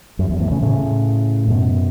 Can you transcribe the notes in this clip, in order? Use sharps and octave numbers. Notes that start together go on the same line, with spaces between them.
F#2
E2
E2 A2
A2 C#3
A2 C#3
F#2 B2